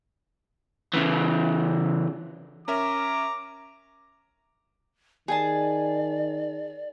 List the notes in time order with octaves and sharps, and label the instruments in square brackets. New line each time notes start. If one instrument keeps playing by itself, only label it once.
[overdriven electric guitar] C#3 E3
[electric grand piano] C#4 A#4 E5 [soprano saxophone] A#5 [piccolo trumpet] D6
[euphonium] D#3 [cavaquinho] G#4 G#5 A5 [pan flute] D5